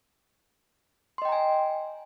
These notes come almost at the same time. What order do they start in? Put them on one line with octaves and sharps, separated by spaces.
C6 D#5 G5 A#5 G#5